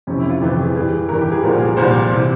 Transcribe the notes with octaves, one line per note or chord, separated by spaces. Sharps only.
F2 C3 E3 C#4
E4
F4
F2 C3 E3 G4
G#4
G2 E3 G#4
G2 E3 A#4
G4
G#4
C2 A#2 F3 A#4
G#4
C2 A#2 F3 C5
C3 E3